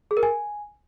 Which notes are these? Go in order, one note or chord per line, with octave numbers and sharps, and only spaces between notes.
G#4
A#4
G#5